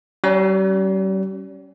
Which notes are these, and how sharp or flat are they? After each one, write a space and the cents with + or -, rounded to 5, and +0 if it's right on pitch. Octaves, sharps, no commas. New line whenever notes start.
G3 -40 C#4 +0